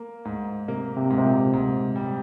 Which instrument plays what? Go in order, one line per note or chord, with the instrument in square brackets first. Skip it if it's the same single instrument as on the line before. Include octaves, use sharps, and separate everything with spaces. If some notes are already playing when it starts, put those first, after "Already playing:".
Already playing: [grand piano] A#3
G#2
[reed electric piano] C3 [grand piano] A#3
[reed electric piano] C3
[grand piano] G#2
[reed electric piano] C3
A#2
[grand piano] G#2
G3